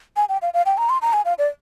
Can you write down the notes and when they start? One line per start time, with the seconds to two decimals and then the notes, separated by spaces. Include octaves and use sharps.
0.16 G#5
0.29 G5
0.42 F5
0.54 F5
0.66 G5
0.78 A#5
0.90 C6
1.02 A#5
1.13 G#5
1.25 F5
1.38 D5